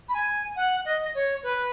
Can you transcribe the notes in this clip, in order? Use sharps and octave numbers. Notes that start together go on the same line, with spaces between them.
B5
G#5
F#5
D#5
C#5
B4